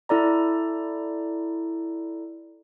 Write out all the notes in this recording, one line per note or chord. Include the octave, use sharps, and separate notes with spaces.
E4 A4 D5 A#5